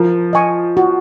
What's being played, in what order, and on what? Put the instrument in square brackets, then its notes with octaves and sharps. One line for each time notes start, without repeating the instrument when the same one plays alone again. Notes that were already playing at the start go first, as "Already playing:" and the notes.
Already playing: [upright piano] F3 [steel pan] A#4
[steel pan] D#5 G#5 C#6
F#4